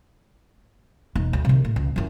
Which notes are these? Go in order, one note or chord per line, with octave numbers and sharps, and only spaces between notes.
E1 D#4
D2
C3 D#3
A2
C#2
F#2 E4